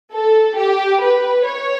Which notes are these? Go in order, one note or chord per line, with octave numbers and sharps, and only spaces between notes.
A4
G4
B4
C#5